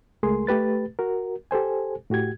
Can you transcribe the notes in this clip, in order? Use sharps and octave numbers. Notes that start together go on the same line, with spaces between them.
C#2 G#3 A3 G#4 A#4 C6
A3 G4 B4 A6
F#4 A#4
G4 A4 C5 G#5
A2 F#4 G4 G#6